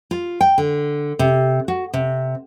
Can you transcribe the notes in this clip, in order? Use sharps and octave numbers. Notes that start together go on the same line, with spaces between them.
F4
G5
D3
C3
F#4
C3